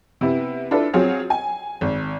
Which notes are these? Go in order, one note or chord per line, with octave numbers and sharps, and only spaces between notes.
C3 B3 E4
D4 E4 F4 A4 B4
F#3 C4 F4 G#4 C#5
G#5
G#1